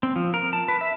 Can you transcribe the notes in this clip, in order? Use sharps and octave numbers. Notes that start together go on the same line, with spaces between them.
C4
F3
A#4
A5
B4
E5